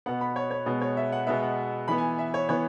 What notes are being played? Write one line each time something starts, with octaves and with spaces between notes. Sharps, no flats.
B2 B3 F#5
B5
C#5
C#5
B2 G#3 B3
C#5
E5
F#5
B2 G#3 B3 E5
F#5
E3 B3 B5
G#5
E5
C#5
E3 B3 C#5